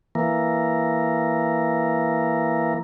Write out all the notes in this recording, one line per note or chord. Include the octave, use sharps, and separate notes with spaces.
E3 A#3